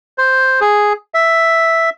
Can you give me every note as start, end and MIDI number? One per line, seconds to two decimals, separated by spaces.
0.18 0.60 72
0.61 0.93 68
1.14 1.90 76